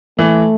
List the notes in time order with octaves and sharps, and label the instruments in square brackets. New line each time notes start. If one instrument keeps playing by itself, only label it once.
[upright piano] E3 [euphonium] A3